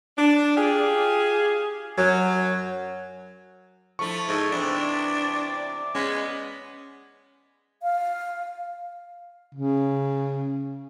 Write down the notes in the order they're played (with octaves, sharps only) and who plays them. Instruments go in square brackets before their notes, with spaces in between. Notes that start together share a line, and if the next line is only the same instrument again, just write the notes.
[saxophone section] D4
F4 G4 G#4
F#2 F#3
[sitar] F3 A3 E4 [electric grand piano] C#6
[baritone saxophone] G#2 [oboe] A4
[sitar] C3 E3 B3 [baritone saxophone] D4
[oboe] D5
[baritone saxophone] G#3 [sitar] B3 [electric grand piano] C#4 B6
[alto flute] F5
[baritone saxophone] C#3